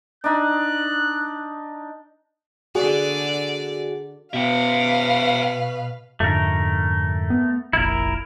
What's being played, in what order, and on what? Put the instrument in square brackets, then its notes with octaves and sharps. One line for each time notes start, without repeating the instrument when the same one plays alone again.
[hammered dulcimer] D4 D#4 [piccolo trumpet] F#6
[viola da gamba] D3 D5 [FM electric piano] F#4 G#4 F#5
[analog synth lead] B2 [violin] B4 F5 [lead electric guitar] E5 G5
[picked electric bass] F2 G#2 D3 [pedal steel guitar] A3 A#4
[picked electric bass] B3
[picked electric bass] F1 A#1 [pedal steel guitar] E4 A#4